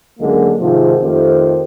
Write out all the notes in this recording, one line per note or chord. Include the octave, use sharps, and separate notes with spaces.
C#2 D3 F#3 G#3 A#3
G#2 C3 D#3 F3
F2 D#3 A3 F4 G4 C5